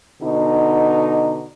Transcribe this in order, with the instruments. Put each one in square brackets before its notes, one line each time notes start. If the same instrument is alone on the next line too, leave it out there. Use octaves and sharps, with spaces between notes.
[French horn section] B2 D3 D#4